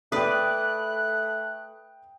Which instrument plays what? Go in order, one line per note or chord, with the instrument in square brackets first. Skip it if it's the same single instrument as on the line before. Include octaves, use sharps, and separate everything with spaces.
[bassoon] A3 [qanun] B4 D5 [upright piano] G5 D#6 [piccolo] F#6